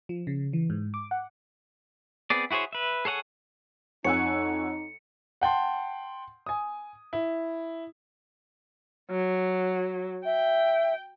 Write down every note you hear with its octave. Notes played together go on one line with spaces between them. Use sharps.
F3
C#3
E3
G#2
D6
F#5
B3 C4 G#4 D5
E4 F#4 G#4 C5 C#5
B4 E5
G#4 A4 C#5 F#5 G#5
F2 D#4 C#5 F#5 G#5 E6 C#7
F#5 G5 A5 C6
G#5 D#6
E4
F#3
E5 G5